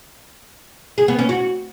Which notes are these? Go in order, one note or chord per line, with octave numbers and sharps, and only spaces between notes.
G#4
B3
C#4
F#4